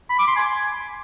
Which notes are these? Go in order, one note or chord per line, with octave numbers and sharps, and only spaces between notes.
B5
D6
C6
G#5